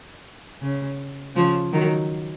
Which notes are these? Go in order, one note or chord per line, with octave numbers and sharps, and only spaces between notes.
C#3
C#3 F3
D#3 F#3